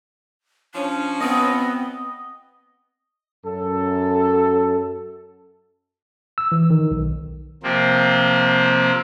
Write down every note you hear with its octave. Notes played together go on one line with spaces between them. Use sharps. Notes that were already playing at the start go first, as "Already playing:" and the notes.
F3 C#4 D4
B3 C4 D#5
F#2 A4
E6
E3
D#3
B1
C3 F3 A#3 C4